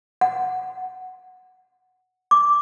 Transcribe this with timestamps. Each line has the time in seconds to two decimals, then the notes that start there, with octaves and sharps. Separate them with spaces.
0.21 F#5
2.31 D6